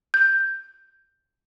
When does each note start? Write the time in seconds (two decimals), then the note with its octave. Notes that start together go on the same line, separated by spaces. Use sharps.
0.14 G6